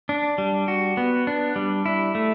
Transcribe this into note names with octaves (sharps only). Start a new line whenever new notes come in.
D4
G3
F#4
B3
D4
G3
E4
A3